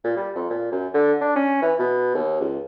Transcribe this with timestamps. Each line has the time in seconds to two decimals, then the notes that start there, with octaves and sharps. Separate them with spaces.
0.04 A#2
0.17 G3
0.36 F2
0.50 A#2
0.72 F#2
0.94 D3
1.21 D4
1.36 C#4
1.62 E3
1.79 B2
2.15 D#2
2.41 C#2